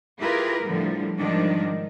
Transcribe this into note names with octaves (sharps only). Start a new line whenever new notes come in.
E4 F4 G4 G#4 A#4 B4
A2 D3 F3 G3
G#2 D#3 F3 G3 D4